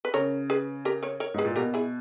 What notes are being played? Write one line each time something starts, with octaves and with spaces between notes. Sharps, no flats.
B4
C#3 A#4 C#5
G#4 B4
G4 A#4
A#4 C#5
A#4 C#5
G#2 G#4 B4
A#2
B2 G4 A#4
E4 G#4